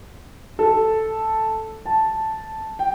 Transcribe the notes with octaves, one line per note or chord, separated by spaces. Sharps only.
A4
A5
G5